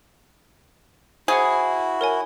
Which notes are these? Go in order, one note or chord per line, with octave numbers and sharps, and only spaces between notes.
E4 F#4 G#4 C5 C#7
A#4 C#5 G#5